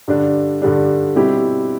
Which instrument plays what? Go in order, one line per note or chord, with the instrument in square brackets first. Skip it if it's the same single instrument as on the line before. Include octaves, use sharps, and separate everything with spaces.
[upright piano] G2 D3 G3 D4
G2 D3 G3 D4
B2 G3 C4 E4 G4